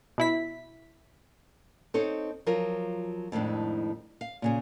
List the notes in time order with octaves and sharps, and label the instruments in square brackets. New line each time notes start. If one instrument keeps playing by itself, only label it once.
[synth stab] B2 E4 B6
[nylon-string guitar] C4 D#4 A4 C5 C#5
F3 F#3 F4 A#4
F2 A2 D#3 G#3 D4
F5
A#2 C#3 G#4